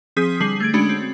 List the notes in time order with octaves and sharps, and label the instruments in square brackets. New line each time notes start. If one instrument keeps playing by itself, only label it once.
[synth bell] F3 C4 G#4 D#6 G6 B6
D3 G3 G#4 C7 F#7
A3 G#6 D7
G#3 C#4 D4 F#4 B5 D7
C4